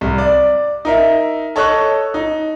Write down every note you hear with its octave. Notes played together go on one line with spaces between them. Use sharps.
C2
D5
D#4 A#4 E5
A4 C#5 D#5 C#6 F#6
D#4